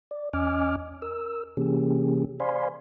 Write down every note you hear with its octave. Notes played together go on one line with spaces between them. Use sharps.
D5
E2 C#4 D#5 G#5 D6 F6
A#4 E6
C3 E3 A#3 C#4 G4 G#4
C5 D5 F5 G#5 B5 C6